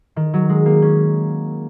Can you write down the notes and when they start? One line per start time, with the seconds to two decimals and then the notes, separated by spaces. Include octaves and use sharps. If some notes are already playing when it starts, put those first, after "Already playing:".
0.16 D#3
0.34 F#3
0.49 G#3
0.66 A#3
0.82 C#4